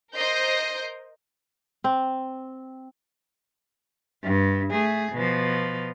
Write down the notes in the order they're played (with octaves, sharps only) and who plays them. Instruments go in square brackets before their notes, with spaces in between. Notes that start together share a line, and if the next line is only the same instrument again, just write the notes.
[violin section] A#4 C5 D#5 G6 C7
[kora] C4
[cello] G2
A3 G#4
B2 F3